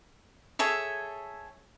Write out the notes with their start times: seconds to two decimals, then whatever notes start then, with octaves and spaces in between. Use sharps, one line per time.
0.59 G#4 A4 C#5 E5